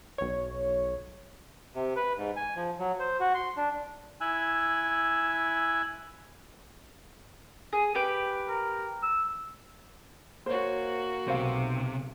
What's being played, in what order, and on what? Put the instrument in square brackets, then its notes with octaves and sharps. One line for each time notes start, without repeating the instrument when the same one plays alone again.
[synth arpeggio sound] B1 C#5
[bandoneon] C3
B4
G#2
G#5
F3
F#3
C5
F#4
C6
D4
[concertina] E4 G#5 E6 F#6
[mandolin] G#4
G4 B4 G5
[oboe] A#4
E6
[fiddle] A#3 F#4 [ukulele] C5 C#5
[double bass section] B1 [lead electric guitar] C3 [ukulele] C5 F5